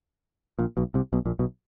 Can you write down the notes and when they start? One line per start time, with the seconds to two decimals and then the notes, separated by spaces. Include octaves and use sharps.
0.59 A#1 A#2
0.77 B1 B2
0.94 C2 C3
1.13 B1 B2
1.26 A#1 A#2
1.39 B1 B2